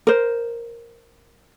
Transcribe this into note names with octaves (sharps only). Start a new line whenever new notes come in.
A#4 C5